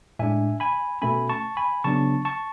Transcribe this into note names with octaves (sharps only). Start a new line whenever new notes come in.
A2 G#3 D4 E5 G#5
G#5 B5
B2 A3 C#4 G#5 B5
A5 C#6
G#5 B5
C#3 F#3 B3 D4 A5 C#6
A5 C#6